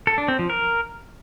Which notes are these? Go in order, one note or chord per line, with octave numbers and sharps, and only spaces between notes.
A4
D4
C4
F3
A#4